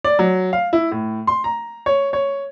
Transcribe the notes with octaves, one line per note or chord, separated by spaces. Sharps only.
D5
F#3
F5
E4
A2
C6
A#5
C#5
C#5